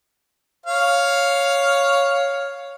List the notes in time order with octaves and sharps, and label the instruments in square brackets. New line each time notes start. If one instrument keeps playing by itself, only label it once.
[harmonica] C#5 F5